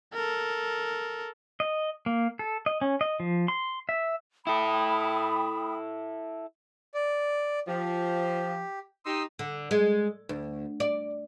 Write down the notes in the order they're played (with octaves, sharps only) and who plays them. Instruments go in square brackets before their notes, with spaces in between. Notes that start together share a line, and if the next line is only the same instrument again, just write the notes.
[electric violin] A4 A#4
[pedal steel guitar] D#5
A#3
A4
D#5
C#4
D#5
F3
C6
E5
[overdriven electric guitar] E4 A4 [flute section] G5 B5 D#6
[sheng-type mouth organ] D5
[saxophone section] F3 [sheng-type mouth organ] G4
[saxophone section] D#4 G4 [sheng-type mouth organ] C6 D#6 E6
[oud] D3
G#3
D2
D5